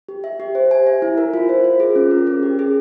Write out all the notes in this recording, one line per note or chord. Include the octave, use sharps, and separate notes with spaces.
G4
E5
G4
C5
G#5
E5
E4
A#4
F4
C5
F4
G#4
C#4
A#4
C#4
G4
G#4